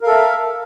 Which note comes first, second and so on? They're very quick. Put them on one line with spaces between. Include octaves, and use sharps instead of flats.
A#4 F5 A4 E5